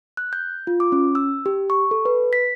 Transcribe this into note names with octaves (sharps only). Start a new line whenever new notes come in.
F#6
G6
F4
D6
C#4
E6
G4
C#6
A4
B4
B6